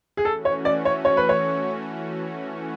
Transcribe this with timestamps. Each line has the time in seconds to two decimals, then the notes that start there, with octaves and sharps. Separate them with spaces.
0.17 G#4
0.25 E3 A3 C#4 F#4 A4
0.45 C#5
0.65 D5
0.85 C#5
1.05 C#5
1.17 B4
1.29 C#5